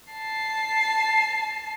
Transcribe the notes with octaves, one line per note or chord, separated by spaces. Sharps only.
A5 C7